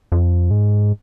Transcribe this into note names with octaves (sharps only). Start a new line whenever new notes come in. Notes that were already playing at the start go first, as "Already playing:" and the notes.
F2
G#2